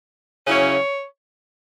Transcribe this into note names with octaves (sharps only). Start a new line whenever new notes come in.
C#3 F#3 C#4 E4 C#5